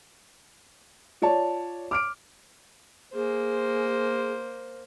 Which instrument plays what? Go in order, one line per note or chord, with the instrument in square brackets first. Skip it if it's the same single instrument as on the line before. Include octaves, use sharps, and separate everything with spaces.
[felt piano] F4 C#5 D5 A5
D6 F6 D7
[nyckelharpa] A#3 C5 [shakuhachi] G#4